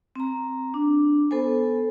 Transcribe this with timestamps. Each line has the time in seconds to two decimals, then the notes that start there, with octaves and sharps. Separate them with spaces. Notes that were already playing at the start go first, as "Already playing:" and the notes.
0.15 C4 A#5
0.74 D4
1.31 B3 A4 C5 G#5